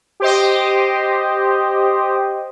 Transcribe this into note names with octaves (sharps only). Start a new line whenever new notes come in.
G4 C5 D#5